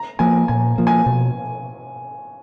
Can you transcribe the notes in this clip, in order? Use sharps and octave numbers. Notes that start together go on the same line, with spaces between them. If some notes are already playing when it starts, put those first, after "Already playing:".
Already playing: A#5
F3 A#3 G#5
A#2 G#5
F3 A#3
G#5
B2